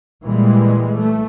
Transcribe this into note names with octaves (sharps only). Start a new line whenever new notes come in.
A#2 E3 G3 G#3
A3